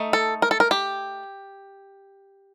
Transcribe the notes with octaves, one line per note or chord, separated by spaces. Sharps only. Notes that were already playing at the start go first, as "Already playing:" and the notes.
Already playing: A3 D#4
A4
A#4
A4
A#4
G4